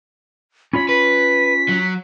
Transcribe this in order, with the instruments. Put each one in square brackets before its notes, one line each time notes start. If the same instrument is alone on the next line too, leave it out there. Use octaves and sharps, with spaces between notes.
[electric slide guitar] C#4 F4 C#5 [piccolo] B5
[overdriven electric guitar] B4 [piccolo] B6
[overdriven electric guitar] F#3